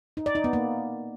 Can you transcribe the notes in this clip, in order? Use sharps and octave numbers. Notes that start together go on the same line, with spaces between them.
D#4
D5
D#4
B3
A#3